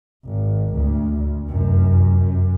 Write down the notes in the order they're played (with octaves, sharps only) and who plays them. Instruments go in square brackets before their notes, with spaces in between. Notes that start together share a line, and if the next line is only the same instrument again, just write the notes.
[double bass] G#1
D2
F1 F#2
F#2